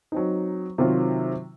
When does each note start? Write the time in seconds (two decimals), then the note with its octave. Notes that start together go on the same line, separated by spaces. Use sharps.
0.12 F#3 C4 D#4
0.78 C3 D#3 F#3 C4 F4